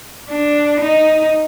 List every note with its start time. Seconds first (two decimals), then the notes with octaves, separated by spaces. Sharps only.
0.29 D4
0.80 D#4